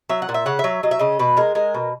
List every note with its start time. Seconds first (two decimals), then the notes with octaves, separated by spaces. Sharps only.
0.09 F#3 E5
0.22 F#5
0.29 A#2
0.34 E5
0.46 C#3 F#5
0.59 F#3 E5
0.83 F#3 D#5
0.91 E5
0.99 C#3 D#5
1.19 B2 B4
1.37 G#3 A#4
1.55 G#3 A#4
1.74 B2